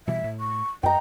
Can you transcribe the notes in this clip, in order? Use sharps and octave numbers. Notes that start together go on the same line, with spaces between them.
B2 E3 G3 E5
A2
C#6
F#2 D#5 G5 A#5